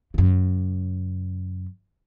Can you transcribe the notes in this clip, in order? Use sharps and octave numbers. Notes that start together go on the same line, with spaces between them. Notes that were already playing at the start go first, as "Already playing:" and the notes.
F#2 C#3